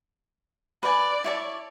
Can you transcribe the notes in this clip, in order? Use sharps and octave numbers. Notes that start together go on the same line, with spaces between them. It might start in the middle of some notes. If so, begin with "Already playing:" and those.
B4 D5 G#5
E4 C#5 A5